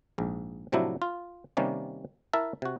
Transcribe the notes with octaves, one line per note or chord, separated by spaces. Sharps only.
A#1 G#2
A2 C3 F3 F#3 D4 E4
F4
C3 D#3 G3 A#3 C#4
E4 A#4 E5 A5
C3 F#4